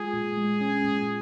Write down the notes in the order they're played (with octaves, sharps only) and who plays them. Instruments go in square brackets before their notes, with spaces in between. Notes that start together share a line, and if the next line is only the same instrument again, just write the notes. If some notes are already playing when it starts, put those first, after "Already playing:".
Already playing: [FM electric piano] G#3 F4 [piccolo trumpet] G#4
[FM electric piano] A#2
G#3
C#4
A#2